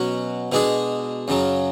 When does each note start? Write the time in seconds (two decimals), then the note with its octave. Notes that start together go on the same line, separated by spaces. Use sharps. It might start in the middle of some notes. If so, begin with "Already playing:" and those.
Already playing: B2 F#3 C#4 F#4
0.52 B2 G#3 D4 G#4
1.28 F#2 C#3 F#3